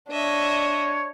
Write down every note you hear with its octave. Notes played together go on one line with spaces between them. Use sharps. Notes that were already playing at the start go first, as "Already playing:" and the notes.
D4 C#5 D#5 E5